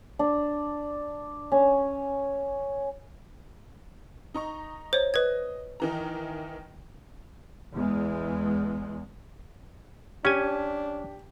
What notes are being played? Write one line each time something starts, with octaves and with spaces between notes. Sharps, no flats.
D4
C#4
D#4 A#5 C#6
C5 C#5
B4 D#5 G#6
D#3 E3 A#5
E2 G#3
C#4 D4 G4 G#5